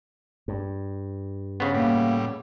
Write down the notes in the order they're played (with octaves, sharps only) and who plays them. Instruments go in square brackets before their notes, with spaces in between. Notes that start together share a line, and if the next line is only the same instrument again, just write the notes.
[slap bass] G2
[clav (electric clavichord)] C#3 B3 [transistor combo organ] C5
[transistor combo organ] A2 G3 [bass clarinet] A#3